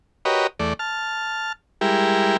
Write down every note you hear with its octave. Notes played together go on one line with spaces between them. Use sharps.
F#4 G4 A#4 B4 C#5 D#5
E2 A3 D5
A5 F6
G3 G#3 E4 G4 A#4